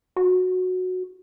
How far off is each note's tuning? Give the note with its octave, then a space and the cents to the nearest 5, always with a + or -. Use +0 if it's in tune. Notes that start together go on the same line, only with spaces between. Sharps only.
F#4 -10